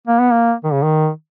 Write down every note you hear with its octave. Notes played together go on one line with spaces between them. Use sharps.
A#3
B3
A#3
D#3
C#3
D#3